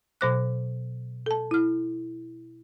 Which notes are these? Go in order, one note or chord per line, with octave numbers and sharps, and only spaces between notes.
B2 F#3 C5 D6 F#6
A4 A5
E4 F6